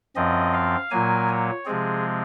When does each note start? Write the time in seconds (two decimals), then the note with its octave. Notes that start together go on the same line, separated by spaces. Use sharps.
0.16 F#2 F3 C4 D#5
0.54 F5
0.91 A#2 F#3 A#3 G#5
1.29 C#5
1.65 C3 F3 G#3 C4 G#4